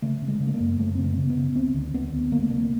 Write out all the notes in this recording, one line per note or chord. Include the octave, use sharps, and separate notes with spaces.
C#3 A3
C#3
G#3
C#3
A3
A#3
F#2
F#2 A3
C#3 C4
B3
C#3
B3
C#3
D2 C4
D2
D2 B3
D2
D2 A#3
A3
C3 A#3